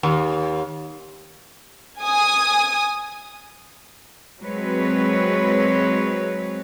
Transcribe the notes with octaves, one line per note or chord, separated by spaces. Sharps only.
D#2
G#5 D#6
F#3 G#3 C4 B4 C#5